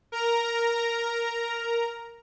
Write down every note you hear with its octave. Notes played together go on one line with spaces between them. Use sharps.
A#4 A#5